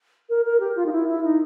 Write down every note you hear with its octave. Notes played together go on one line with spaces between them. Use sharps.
A#4
A#4
G4
F4
D#4
E4
E4
D#4